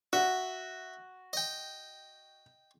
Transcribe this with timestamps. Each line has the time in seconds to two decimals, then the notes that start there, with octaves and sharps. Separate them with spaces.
0.13 F#4 E5
1.33 D#5 G5